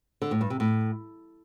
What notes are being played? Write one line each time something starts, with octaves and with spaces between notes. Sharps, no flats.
D3
A2
G2
C3
A2